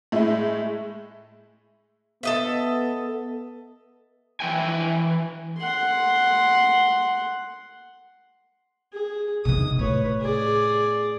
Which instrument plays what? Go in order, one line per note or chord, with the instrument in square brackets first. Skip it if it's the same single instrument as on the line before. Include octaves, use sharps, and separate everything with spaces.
[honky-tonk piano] A2 G#3 E4
[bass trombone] B3 [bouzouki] A4 D#5 E5
[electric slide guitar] E3 E4 G5 G#5
[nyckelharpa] F#5 C6
G#4
[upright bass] C3 D#3 [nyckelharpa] D#6
[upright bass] A2 [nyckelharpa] B4 C#5
[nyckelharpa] G#4 D5